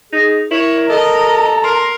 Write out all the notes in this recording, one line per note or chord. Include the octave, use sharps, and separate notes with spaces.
D#4 G#4
E4 A#4 C#5
A4 D#5 A#5
A#4 C6